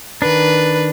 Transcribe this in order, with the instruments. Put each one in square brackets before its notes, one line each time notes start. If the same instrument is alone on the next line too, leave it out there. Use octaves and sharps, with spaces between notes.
[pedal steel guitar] D#3 D4 [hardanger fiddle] B4